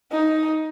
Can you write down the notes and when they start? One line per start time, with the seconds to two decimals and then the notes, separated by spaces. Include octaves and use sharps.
0.12 D#4